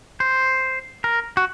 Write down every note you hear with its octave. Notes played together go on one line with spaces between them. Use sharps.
C5
A#4
F#4